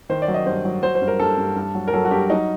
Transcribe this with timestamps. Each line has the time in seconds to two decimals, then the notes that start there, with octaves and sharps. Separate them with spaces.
0.09 D#3 C5
0.22 D5
0.28 F#3
0.34 D#5
0.46 G2 C5
0.65 F#3
0.83 F#3 C5
0.95 C5
1.02 G2
1.08 A#4
1.19 G2 A4
1.38 G2
1.56 G2
1.75 F#3
1.88 A#4
1.93 F#3 A4
2.05 F#4
2.11 G2 G4
2.30 F#3 D#4